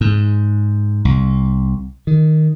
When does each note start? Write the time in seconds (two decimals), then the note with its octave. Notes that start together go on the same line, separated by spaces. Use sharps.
0.01 G#2
1.05 C2
2.07 D#3